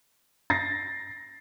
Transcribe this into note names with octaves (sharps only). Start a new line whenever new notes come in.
A6 A#6 C7